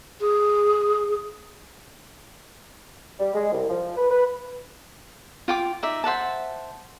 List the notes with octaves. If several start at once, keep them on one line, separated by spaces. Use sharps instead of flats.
G#4
G3
G#3
C2
F3
B4
B4
F4 G5 D6
D#4 D5 E5
C5 E5 F#5 A5